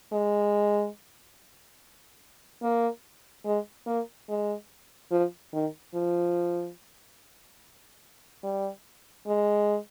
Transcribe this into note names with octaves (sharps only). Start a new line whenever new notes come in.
G#3
A#3
G#3
A#3
G#3
F3
D#3
F3
G3
G#3